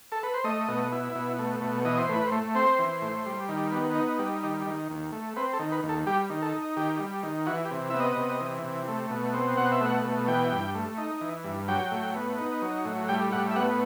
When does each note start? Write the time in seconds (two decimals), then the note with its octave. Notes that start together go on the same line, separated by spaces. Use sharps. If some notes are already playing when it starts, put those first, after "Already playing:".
0.12 A4
0.23 B4
0.34 C5
0.44 A3 D#5
0.68 B2
0.92 E4
1.15 B2
1.39 A3
1.61 B2
1.85 E3 D#5
1.98 C5
2.09 A2 B4
2.27 C5
2.32 A3
2.55 C4 C5
2.79 E3
3.02 A2
3.26 G3
3.48 D#3
3.72 B3
3.95 D#4
4.19 G3
4.43 D#3
4.67 D#3
4.90 D#2
5.12 A3
5.36 C4 B4
5.53 A4
5.59 D#3
5.72 B4
5.83 D#2
5.89 A4
6.06 G3 G4
6.30 D#3
6.42 A4
6.53 D#4
6.77 D#3 G4
7.00 G3
7.23 D#3
7.47 E3 F#4
7.65 G4
7.71 C3
7.90 B3 E5
8.00 D#5
8.17 C3
8.41 E3
8.64 C3
8.88 A3
9.11 B2
9.34 C4
9.57 B2 F#5
9.72 E5
9.81 A3 F#5
10.05 B2
10.28 E3 G5
10.52 G2
10.75 A3
10.98 D#4
11.21 E3
11.44 G2
11.68 F#3 G5
11.91 A2
12.15 B3
12.38 D#4
12.62 F#3
12.85 A2
13.08 G3 G5
13.32 A2 F#5
13.51 E5
13.56 B3 F#5